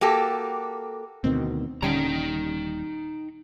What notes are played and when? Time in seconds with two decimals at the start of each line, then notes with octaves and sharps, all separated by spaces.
0.01 A#3 F#4 G4 A4
1.24 D2 B2 D#3 C4
1.82 D#1 D3 G3 C#4 D#4 G5 A#5 D7